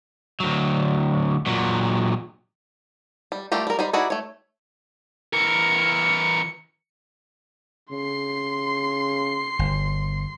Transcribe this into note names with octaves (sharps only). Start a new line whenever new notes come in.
D2 F#3
A#2 F#3
G3
G3 A3 F4 G4 A#4
G3 A#4
G3 D#4 C5 B5
D#4 E4 F#4 G#4 D5
A3 C#5
E3 A#4 C#7
C#3 C6 C7
G1